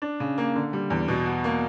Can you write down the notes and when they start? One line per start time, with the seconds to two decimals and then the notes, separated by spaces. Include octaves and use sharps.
0.02 D4
0.20 C#3
0.38 A#3
0.55 D3
0.73 G3
0.90 E2
1.08 B2
1.26 F#4
1.44 A#3